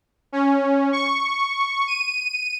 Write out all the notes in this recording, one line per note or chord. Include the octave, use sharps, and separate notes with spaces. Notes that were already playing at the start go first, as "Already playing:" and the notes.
C#4
C#6
D#7